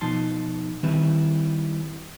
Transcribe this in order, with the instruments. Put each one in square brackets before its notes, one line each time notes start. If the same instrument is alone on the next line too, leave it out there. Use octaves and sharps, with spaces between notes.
[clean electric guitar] B2 F3 D#4 A5 C6
D#3 G3 C4 E4 B4